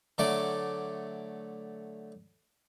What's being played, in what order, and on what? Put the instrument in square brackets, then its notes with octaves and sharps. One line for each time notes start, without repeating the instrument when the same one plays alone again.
[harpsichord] D3 F#3 A3 D5 D6